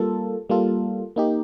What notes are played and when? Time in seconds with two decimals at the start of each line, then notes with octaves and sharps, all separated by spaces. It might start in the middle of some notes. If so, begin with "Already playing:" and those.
Already playing: G3 A#3 F4 A4
0.49 G3 A#3 F4 A4
1.16 A#3 D#4 G4